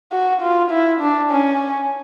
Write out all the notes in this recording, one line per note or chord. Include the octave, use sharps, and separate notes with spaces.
F#4
F4
E4
D4
C#4